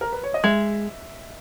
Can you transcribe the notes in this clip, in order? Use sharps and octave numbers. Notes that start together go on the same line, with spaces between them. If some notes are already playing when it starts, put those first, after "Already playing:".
A#4
B4
C#5
D#5
G#3 E5